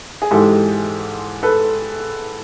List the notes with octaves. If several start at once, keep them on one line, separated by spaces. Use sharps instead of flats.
G#4
G#2 E3 G#3 G4 A4
A4 B4